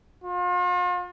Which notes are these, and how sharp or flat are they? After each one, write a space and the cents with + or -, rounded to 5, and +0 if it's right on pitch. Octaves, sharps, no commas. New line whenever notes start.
F4 +40